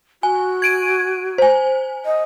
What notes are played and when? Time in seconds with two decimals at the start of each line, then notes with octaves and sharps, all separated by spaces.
0.23 F#4 G#5
0.62 G#6 D7 D#7
1.38 C5 G#5
2.06 D#5